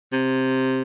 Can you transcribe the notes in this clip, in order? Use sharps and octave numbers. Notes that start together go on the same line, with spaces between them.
C3